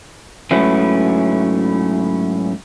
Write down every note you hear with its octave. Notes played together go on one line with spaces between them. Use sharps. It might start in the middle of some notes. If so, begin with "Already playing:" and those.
G#2 F#3 A3 C#4 E4 B4